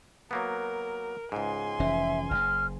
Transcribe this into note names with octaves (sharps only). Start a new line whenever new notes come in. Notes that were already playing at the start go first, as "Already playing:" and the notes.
F#3 A#3 B3 A#4
C#2 G#2 G#5 C6
F1 E3 C#4 E5
F#1 C#3 F6